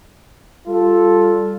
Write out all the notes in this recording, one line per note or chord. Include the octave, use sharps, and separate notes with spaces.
G3 F4 A4